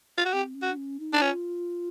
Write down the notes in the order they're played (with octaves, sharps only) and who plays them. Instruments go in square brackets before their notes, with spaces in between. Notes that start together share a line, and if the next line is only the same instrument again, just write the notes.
[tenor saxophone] F4
F#4
[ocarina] C4 [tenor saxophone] G4
[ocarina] C#4
[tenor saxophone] F#4
[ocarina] D4
C#4
D#4
[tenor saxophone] D4
[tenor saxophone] C#4 [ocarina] F4